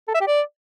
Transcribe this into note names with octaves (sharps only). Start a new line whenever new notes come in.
A4
E5
G4
D5